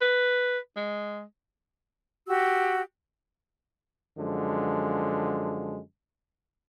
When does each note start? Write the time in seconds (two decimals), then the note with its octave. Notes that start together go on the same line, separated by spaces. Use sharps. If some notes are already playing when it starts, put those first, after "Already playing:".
0.01 B4
0.77 G#3
2.28 F#4 G4 E6
4.18 F#2 D3 F3 G#3